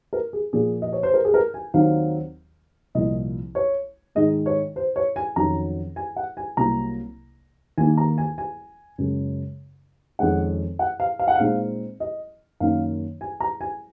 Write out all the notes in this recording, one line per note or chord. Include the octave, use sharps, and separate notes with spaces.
A#4
G#4
A#2 F3 A#3 G#4
D#5
C#5
C5
A#4
G#4
A#4
G#5
D#2 D#3 F#3 C4 D#4 F5
C2 A#2 F3 D#5
C#5
G#2 D#3 G#3 D#4 D#5
C#5
C5
C#5
G#5
F2 D#3 F#3 C#4 A#5
G#5
F#5
G#5
C2 C3 F#3 A#3 A#5
D#2 D#3 A#3 D#4 G#5
A#5
G#5
G#5
F#2 C#3 G#3
F2 D#3 G#3 C#4 F#5
F#5
F5
F5
F#5
A#2 G#3 C4 D#4 F5
D#5
F#2 D#3 A#3 D#4 F5
G#5
A#5
G#5